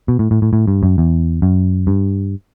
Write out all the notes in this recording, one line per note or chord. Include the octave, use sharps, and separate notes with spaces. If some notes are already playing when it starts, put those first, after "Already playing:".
B2
A2
A2
A2
A2
G2
F#2
E2
F#2
G2